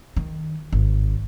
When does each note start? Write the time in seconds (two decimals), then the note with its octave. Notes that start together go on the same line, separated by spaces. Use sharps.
0.17 D#3
0.72 G#1